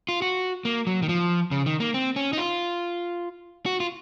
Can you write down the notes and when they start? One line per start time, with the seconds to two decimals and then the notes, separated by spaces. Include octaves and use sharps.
0.09 F4
0.22 F#4
0.65 A#3
0.87 F#3
1.02 D#3
1.09 F3
1.51 C#3
1.66 D#3
1.80 A#3
1.94 C4
2.16 C#4
2.33 D#4
2.37 F4
3.66 F#4
3.80 F4